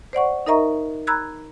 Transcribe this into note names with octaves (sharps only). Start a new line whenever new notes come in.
C5 D5 F#5 C#6
D#4 A#4 D#5 E5 A#5 C#6
A#5 B5 E6 F#6 G#6